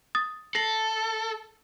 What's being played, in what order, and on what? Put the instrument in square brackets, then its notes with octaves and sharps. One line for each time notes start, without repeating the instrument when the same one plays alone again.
[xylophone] D#6 A6
[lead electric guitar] A4 [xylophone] A#6 C7 F#7